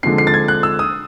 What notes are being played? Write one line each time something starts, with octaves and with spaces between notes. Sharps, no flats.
D3 F3 G#3 C4 C7
C7
A6
G#6
F#6
E6
D#6